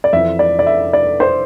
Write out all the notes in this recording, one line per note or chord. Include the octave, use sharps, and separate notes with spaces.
D5
F2 E3 E5
D5
D5
E5
D5
C5